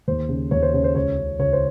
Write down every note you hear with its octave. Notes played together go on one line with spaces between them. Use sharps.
D#2 C5
C#3
D#2 C#5
C5
C#3 C#5
C5
C#2 C#5
C#3
C#2 C#5
C5